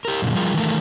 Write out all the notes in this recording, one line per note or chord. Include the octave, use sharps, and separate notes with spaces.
G4 A#4
F#2 A#2 D3
F3 G3 F4 G#4 A#4
D#3 E3 A3 A#4